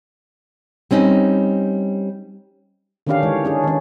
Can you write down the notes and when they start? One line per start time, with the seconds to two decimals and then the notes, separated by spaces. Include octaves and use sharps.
0.91 G3 C4 C#4 D#4
3.07 D3 D#3 C#4 D4 G4 F5
3.23 E3 G#3 C#5
3.45 C#4 D4 G#4
3.64 D#3 C#4